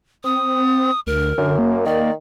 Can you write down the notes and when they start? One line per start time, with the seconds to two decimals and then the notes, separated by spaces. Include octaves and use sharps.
0.24 C4 D#6
1.07 D2 A#4
1.38 F#2 D3
1.58 A#3
1.86 D#3 D5